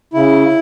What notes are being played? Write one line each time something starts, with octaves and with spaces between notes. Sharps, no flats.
C#3 E4